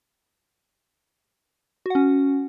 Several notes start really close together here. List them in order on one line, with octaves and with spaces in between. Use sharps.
F#4 F#5 C#4